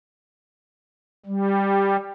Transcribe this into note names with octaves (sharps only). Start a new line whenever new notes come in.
G3